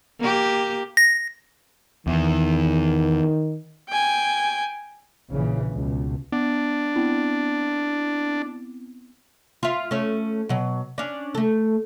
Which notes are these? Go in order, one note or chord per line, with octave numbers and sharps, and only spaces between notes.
A#3 G4
A#6
E2 D#3
G5 G#5
A#1 C#3 E3
C#2 B2
B3 D4
B3 C4 E4
F4 E5
A3 C#4
B2 F#3
C#4 D4
A3 A4